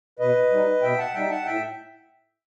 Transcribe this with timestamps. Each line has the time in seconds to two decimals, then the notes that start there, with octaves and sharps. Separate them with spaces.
0.19 B2 B4 D#5
0.51 G3 D#4
0.82 B2 E5 G5
0.98 F#5 A5
1.14 G3 D#4 E5 G5
1.30 F#5 A5
1.45 A2 E5 G5